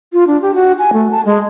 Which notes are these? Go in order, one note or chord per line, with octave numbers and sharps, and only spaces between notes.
F4
D4
G4
F#4
G#5
A3
A5
G#3